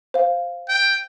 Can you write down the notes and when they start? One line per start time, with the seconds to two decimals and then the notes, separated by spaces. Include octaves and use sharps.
0.14 C5 F5
0.69 G5